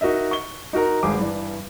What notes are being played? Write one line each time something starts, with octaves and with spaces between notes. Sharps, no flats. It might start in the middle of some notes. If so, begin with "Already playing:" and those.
D#4 F#4 A#4 D#5 E5
C#6 G7
D#4 F#4 A#4 A#5
G#1 G2 G#4 D6
G2 E3 D5